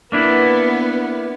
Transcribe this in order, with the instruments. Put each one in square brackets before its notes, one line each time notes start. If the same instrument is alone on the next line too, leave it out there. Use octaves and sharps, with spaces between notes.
[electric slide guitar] A#3 D4 E4 [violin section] B3